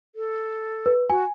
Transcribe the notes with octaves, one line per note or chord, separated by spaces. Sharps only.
A4
B4
F#4 G#5